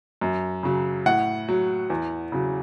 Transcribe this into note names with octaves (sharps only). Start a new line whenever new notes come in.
F#2
C#3 F#3
A2 F#5
F#3
E2
C#3 F#3